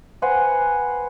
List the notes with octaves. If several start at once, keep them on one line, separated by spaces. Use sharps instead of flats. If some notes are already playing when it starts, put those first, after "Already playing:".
B4 C5 F#5 G#5